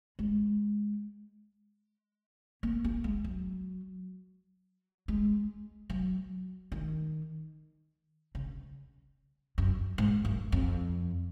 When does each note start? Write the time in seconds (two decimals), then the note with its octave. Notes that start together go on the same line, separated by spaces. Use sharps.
0.19 G#3
2.63 A#3
2.84 A#3
3.04 G#3
3.24 F#3
5.08 G#3
5.90 F#3
6.72 D#3
8.35 C#3
9.58 F#2
9.98 G#2
10.25 F#2
10.52 F2